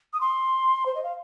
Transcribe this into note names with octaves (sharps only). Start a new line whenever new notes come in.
D#6
C6
C5
D#5
F5